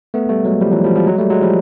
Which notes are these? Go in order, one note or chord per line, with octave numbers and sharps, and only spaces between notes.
A3 B3
G3 A3
F#3 G#3
F3 G3
E3 F#3
F3 G3
F3 G3
F#3 G#3
G3 A3
F#3 G#3
F3 G3